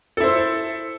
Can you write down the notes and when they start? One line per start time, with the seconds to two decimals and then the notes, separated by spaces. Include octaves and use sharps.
0.17 A4
0.20 E4
0.24 C5